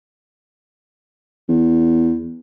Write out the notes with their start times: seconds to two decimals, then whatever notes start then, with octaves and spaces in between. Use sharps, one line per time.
1.49 E2